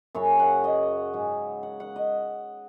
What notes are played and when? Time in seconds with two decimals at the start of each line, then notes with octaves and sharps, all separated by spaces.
0.15 F#2 C#3 F#3 C#5
0.39 F#5
0.64 D#5
1.13 G#2 F#3
1.63 F#5
1.80 F#5
1.96 D#5